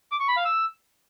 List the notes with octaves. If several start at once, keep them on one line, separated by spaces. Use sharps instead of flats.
D6
C#6
B5
F5
E6